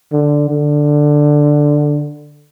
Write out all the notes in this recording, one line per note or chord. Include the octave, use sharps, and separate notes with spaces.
D3
D3